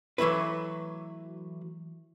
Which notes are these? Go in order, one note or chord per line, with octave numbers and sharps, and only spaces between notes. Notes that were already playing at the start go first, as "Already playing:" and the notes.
E3 F#3 A3 E4 B4